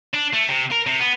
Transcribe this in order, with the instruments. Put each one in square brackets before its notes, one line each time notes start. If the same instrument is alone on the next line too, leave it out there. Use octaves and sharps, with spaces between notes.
[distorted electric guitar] D4
A3
C3
A#4
C3
B3